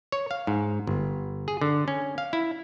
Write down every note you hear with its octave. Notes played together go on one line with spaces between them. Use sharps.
C#5
F5
G#2
G1
G#4
D3
C#4
F5
E4